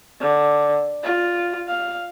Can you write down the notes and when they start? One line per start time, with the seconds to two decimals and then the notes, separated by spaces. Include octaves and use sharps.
0.20 D3
1.03 F4
1.68 F5